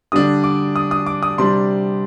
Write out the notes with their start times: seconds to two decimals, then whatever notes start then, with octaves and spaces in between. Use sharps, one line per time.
0.12 D3 G3 D4 D#6
0.44 D6
0.76 D#6
0.91 D#6
1.06 D6
1.23 D#6
1.38 C3 G3 D4 C6